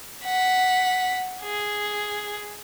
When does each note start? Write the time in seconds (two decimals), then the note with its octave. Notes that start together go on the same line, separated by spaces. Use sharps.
0.24 F#5 B6
1.42 G#4